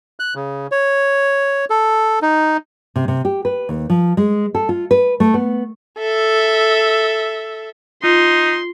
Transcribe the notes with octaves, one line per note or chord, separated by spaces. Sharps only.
F#6
C#3
C#5
A4
D#4
C3
C3
G4
B4
D#2
F3
G#3
A4
F4
B4
A3
B3
A4 E5
D#4 F4 C6